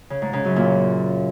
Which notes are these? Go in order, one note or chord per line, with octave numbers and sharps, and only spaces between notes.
C#3
G#2
C#3
F#2
A#2